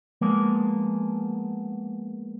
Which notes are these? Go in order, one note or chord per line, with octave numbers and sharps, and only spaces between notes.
F3 G#3 A#3 B3